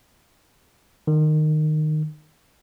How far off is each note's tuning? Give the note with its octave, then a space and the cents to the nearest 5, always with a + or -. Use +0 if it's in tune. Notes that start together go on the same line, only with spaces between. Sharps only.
D#3 -20